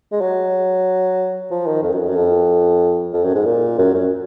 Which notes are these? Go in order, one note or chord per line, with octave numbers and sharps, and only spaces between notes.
G#3
F#3
F3
D#3
F2
F#2
F2
F#2
F2
F2
F#2
G#2
A#2
F#2
F#2